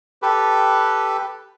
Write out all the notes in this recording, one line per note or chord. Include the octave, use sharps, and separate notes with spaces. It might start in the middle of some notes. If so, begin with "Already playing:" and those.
G4 A4 B4